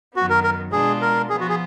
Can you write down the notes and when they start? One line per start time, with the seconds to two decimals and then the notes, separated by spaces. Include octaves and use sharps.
0.16 F#2 D#3 F#3 B3 F#4
0.30 A#4
0.44 A#4
0.72 B2 G#3 B3 D4 F4 G#4
1.02 A#4
1.30 F3 B3 F4 G#4
1.40 F#4
1.49 G#4